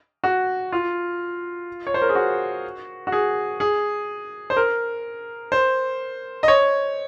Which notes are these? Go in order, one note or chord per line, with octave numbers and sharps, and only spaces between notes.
F#4
F4
C#5
C5
A#4
G#4
F#4
F#4
G#4
G#4
C5
A#4
C5
D#5
C#5